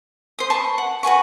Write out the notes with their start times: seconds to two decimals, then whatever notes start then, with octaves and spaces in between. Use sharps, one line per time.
0.39 C5 D#6
0.50 B4 A5 C6 C#6
0.78 F#5
1.03 F#4 B4 G#5 C#6